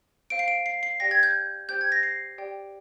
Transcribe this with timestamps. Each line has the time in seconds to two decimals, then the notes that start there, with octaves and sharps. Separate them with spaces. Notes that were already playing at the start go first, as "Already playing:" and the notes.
0.30 C5 F5 D7
0.39 C7
0.48 D7
0.66 C7
0.83 C7
1.00 G4 D5 G5 A#6
1.11 G#6
1.23 G6
1.69 G4 C5 G5 G6
1.81 G#6
1.92 A#6
2.03 C7
2.38 G4 D5 G5